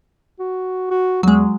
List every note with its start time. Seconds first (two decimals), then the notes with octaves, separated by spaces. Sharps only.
0.39 F#4
0.90 F#4
1.23 E2 F#3 G#3